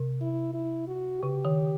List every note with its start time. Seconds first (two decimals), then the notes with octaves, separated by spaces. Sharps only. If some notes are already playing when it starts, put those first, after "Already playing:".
Already playing: C3
0.21 E4
0.54 E4
0.88 F#4
1.21 C#3 G4
1.45 D#3